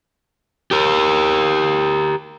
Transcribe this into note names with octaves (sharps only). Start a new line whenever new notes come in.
G4 A#4